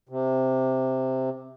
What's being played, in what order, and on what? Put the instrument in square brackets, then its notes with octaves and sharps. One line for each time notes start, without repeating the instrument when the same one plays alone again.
[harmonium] C3